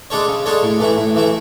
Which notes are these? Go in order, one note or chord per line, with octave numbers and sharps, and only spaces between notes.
G#3 D4 A4 C#5
C#3
G#3 D4 A4 C#5
A2
E3 A3 E4
A2
E3 A3 E4